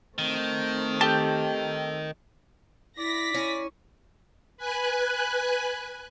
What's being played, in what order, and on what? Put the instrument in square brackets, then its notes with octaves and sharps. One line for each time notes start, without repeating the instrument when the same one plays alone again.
[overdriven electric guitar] D#3 [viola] A3 C4
[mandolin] G4 [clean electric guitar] A4 A5
[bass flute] E4 [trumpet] D5 [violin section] A#6 B6
[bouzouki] C#4 [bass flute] E4
[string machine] B4 G#5 F#6